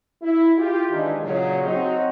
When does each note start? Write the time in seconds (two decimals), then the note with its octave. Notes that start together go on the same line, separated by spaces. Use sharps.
0.22 E4
0.57 F4 G4
0.91 D#3 E3 G#3 D4 D#4
1.22 A#2 C#3 F#3
1.64 F#3 C4 D#4 F#4